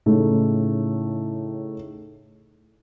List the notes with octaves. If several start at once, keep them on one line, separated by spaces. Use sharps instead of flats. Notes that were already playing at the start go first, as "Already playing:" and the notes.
A2 C#3 A3 D#4